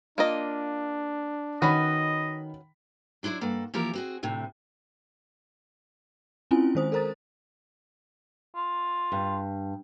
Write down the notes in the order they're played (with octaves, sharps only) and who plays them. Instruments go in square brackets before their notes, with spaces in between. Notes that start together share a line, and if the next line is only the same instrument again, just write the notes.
[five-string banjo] A#3 F4 D#5 [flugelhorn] D4
[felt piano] D#3 B5 [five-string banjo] C#4 F#4 B4 [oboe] D#5
[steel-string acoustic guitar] F#3 D4 E4 G#4 C5
G2 A#3 A4 F#5
E3 F3 A#3 G4 A#4
C4 F#4 G#4
D2 A2 C3
[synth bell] C4 C#4 E4 F4 G#5
D#3 G#3 C5 D#6
A4 A#4 C5 A#5 A6
[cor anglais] F4
[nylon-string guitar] G2